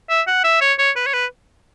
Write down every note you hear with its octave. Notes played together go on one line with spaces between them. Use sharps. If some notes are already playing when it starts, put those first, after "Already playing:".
E5
F#5
E5
C#5
C#5
B4
C#5
B4